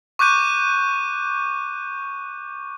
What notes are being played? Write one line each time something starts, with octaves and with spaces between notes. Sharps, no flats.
C#6 D6 F#6 G6 D#7